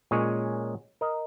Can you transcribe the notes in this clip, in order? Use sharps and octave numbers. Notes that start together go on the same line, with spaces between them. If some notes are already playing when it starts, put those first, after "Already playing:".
A#2 G#3 C#4 G#4 C#5
A#4 D#5